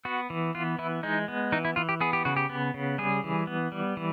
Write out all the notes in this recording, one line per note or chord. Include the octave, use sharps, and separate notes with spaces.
B3 F#4
E3
B3 F4
E3 E4
G#3 D#4
B3
E3 D#4
E4
E3 F4
G4
B3 G#4
G4
C#3 F#4
G4
B3
C#3
G3 G#4
E3
B3
G3
E3